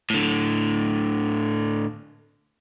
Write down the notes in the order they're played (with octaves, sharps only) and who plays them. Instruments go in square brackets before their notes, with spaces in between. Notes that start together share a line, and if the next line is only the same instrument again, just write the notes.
[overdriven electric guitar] A2 D3